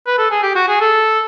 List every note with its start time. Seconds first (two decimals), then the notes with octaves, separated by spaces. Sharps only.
0.06 B4
0.18 A4
0.31 G#4
0.43 G4
0.55 F#4
0.68 G#4
0.80 A4